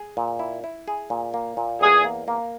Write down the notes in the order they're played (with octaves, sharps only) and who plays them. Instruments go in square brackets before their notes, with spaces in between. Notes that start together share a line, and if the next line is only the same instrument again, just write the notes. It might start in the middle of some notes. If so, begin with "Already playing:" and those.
Already playing: [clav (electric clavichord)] G#4
A#2
E4
E4
G#4
A#2
A#3
A#2
[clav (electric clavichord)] E2 [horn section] G#4
[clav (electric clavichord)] A#3
A#3